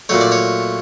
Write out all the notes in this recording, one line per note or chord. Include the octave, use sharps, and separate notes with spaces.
A#2 F#3 A3 C#5
D5
C#5